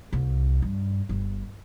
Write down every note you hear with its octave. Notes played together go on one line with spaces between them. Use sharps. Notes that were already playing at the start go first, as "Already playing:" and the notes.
C2
G2
G1